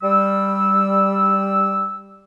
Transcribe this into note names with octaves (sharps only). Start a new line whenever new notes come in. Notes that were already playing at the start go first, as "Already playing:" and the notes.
G3 E6